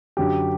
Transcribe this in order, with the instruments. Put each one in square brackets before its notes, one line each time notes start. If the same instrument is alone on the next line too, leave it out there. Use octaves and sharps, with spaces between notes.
[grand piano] F#2 D3 F#3 G4